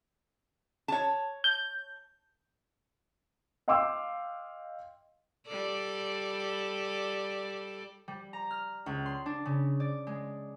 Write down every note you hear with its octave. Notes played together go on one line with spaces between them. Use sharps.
C#5 A5
G6
D#5 F5 G5 C6 D6 E6
G3 A4 D5
G3
A#5
F6
C#2
C6
D4
C#3
D5
G#3